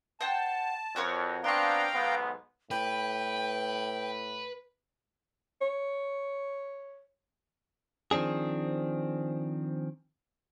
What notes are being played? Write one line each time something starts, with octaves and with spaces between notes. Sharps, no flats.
C5 F#5 G5 A5
F2 F#4 A#4 C#5
B3 C4 D4 F5 G5 A#5 C6 C#6
B1 G#2 B3
A2 B4 G5
C#5
D#3 F3 C4 D4 G#4